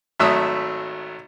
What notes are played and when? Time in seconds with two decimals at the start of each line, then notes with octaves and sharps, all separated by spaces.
0.19 G#1 F#3 A3 E5 D#6 E6